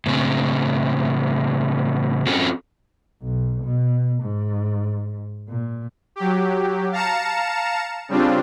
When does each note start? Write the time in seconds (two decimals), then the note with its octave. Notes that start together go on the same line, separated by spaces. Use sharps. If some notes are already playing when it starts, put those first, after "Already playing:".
0.06 A2 C#3 C4
2.26 C4 C#4 F4 F#4 A4
3.22 B1
3.64 B2
4.22 G#2
5.48 A#2
6.16 F#3 G4
6.92 F5 A5 A#5 C#7 E7
8.09 C#3 G3 C4 D4 F4